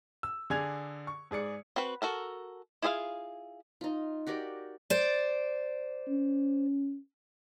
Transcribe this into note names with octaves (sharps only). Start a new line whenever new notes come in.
E6
D3 G#4 D5 G#5 G#6 F7
C#6
G#2 G#4 D5 C#7
C4 F#4 B4
F#4 A4 A#4
E4 F4 G#4 E5 F5
D#4 F4
F#4 G4 A#4 D5
C5 D5
C#4